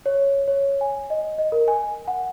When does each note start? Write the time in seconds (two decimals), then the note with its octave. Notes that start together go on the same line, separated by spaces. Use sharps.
0.06 C#5
0.48 C#5
0.81 G#5
1.10 D#5
1.38 D#5
1.52 A#4
1.68 G#5
2.08 F#5